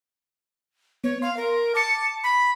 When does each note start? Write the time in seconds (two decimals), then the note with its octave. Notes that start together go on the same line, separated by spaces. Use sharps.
1.04 B3 C#5
1.22 F5 C6
1.37 A#4
1.75 A5 D6 C#7
2.24 B5